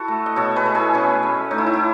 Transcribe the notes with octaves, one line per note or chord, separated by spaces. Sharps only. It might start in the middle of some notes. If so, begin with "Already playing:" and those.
Already playing: E4 F#4 A4
A3
D#5
B2 A4 C#5
G#4 B4
A3
E4 G#4
B2 C#4
A3
A2 D#4
E4
D#4
E4